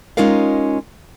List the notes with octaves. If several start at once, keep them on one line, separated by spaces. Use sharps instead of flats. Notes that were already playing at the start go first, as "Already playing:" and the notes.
G#3 C#4 D#4 F4 A#4 F5